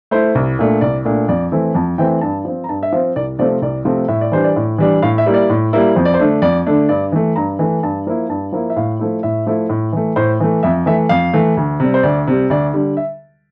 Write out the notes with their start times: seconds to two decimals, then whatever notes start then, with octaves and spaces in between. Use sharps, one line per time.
0.11 A3 E4 C5
0.35 C2
0.59 A#2 A3 D4
0.81 C2 D5
1.05 A#2 A3 D4
1.28 F2 D5
1.52 E3 A3 C4 E4
1.75 F2 A5
1.98 E3 A3 C4 E4 G5
2.21 G2 A5
2.45 F3 C4
2.64 A#5
2.69 G2 A5
2.83 E5
2.92 F3 F5
2.96 C4
3.16 C2 D5
3.39 C3 F3 A3 C4 D5
3.62 C2 D5
3.85 C3 F3 A3 C4
4.08 A2 E5
4.21 D5
4.32 E3 G3 D4 C5
4.44 D5
4.56 A2
4.78 E3 G3 D4
5.02 A2 F5
5.18 E5
5.26 G3 A#3 E4
5.34 D5
5.50 A2
5.73 G3 A#3 E4
5.95 F2 C5
6.05 D5
6.14 C5
6.19 D3 A3 D4
6.42 F2 D5
6.67 D3 A3 D4
6.89 G2 D5
7.12 E3 A3
7.36 G2 A#5
7.59 E3 A3
7.83 G2 A5
8.07 F3 A#3 E4
8.29 G2 A5
8.52 F3 A#3 E4
8.70 E5
8.76 A2 F5
8.99 F3 A3 E4
9.23 A2 E5
9.47 F3 A3 E4
9.69 A2
9.92 E3 A3
10.16 A2 C5
10.40 E3 A3
10.63 F2 E5
10.86 E3 A3 E5
11.09 F2 F5
11.33 E3 A3
11.57 D2
11.80 C3 G3
11.94 C5
12.03 D2 D5
12.27 C3 G3
12.50 D2 D5
12.73 D3 G3
12.97 E5